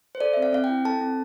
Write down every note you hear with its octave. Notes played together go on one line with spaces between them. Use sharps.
C5
A4 D5
C4 E5
F5
C4 F5
G5
E4
A4 A5
C4